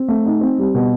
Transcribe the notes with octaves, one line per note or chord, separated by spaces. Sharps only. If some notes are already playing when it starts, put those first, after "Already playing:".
Already playing: C4
A3
D#4
C4
G3
B2